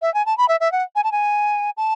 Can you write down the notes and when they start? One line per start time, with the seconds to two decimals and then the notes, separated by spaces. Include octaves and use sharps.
0.02 E5
0.14 G#5
0.26 A5
0.38 B5
0.48 E5
0.60 E5
0.72 F#5
0.96 G#5
1.04 A5
1.12 G#5
1.77 A5